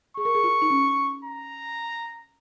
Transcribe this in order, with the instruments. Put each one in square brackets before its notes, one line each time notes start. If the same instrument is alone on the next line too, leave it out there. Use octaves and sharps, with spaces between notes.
[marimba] G#4 [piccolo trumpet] C#6
[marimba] A#4
G#4
F4
D#4
C#4
[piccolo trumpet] A#5